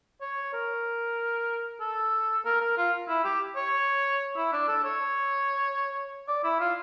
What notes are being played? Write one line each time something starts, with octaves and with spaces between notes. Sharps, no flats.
C#5
A#4
A4
A#4
A#4
F4
E4
G4
C#5
E4
D4
A4
C#5
D5
E4
F4